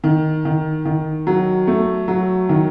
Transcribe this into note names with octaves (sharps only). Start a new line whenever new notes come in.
D#3
D#3
D#3
F#3
A3
F#3
D#3